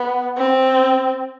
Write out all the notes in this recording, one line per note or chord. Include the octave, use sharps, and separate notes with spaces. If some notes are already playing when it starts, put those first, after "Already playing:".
Already playing: B3
C4